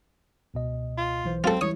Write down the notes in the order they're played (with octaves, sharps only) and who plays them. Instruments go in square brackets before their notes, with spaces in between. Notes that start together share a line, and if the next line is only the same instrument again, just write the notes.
[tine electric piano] C#2 B2 D#5
[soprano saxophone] F4
[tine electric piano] B1 E3 C5
[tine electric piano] F#3 [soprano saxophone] C4 [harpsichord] F4 A4
[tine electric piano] E3 G3 E4 [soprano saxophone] C#5 [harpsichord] D#6